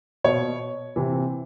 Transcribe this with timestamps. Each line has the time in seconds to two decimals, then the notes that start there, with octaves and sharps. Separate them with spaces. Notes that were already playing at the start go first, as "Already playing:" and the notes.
0.24 B2 C#5
0.96 C3 E3